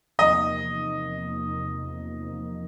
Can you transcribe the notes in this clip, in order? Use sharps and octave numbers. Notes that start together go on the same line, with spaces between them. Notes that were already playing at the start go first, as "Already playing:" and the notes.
E2 C3 F3 A#3 D#4 D#5